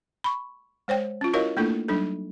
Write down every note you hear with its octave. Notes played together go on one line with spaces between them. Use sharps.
B5 C#6
G#3 C5 C#5 G5
C#4 F4
E4 F#4 A#4 C#5 D#5 F5
A3 A#3 D4 E4 F4 A4
F#3 G3 D4 D#4 A4